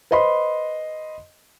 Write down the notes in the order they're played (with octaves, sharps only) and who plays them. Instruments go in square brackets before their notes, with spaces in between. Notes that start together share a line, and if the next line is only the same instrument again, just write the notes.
[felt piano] B4 C5 D#5 B5 C6